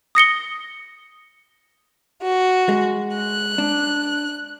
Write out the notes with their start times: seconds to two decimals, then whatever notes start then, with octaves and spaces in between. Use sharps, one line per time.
0.15 D#6 A#6 C#7 G7
2.20 F#4
2.69 G#3
3.13 F#6
3.58 D4